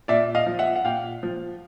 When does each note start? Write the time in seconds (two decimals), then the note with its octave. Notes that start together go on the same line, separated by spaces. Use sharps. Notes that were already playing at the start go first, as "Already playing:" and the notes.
0.08 A#2 D5 E5
0.35 D#5 F5
0.47 F3
0.59 E5 F#5
0.76 F#5
0.84 A#2 F5 G5
1.23 F3